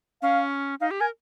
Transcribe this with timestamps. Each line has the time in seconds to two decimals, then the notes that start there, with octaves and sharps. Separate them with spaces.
0.22 C#4 F5
0.80 D#4 F5
0.91 G4
1.00 A#4 G#5